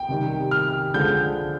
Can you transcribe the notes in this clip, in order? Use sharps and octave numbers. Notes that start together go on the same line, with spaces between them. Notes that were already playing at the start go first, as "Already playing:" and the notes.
Already playing: G5
C3 D#3 G3
F6
D3 F3 G#3 G6